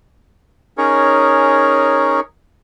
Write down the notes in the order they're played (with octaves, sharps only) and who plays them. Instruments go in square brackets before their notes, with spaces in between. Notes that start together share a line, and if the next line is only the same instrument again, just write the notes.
[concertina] C#4 D#4 G#4 A#4 C#5